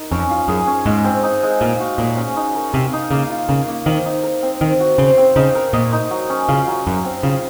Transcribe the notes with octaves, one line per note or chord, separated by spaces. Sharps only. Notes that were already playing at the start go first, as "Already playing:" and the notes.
Already playing: D#4 A#4
F2 C#4
F4
F#2 G#4
C#4
G#2 G#3
C4
D#4
G#3
A#2 F5
F#4
A#2 C#5
C#4
D#4
A#4
C3 F5
D#4
C#3 A#3
F4
C#3 A#4
A#3
D#3 C4
D#4
A#4
C4
D#3 C4
F#4
C#3 C5
C4
C#3 D#4
A#4
A#2 D#5
D#4
F#3
C#4
C#3 F4
F#3
F#2 F#3
C4
C#3 F4